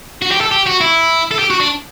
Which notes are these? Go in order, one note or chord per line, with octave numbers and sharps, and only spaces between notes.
F#4
G4
A4
G4
F#4
E4
A4
G4
F#4
D4